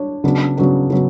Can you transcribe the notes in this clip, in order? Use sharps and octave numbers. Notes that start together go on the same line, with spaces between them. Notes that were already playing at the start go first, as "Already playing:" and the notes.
Already playing: D4 C#5
C#3 F#3 B3 D4
C#3 F#3 B3 D4
C#3 F#3 B3